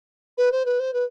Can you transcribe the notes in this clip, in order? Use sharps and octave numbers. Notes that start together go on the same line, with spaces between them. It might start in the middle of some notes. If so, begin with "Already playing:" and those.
B4
C5
B4
C5
B4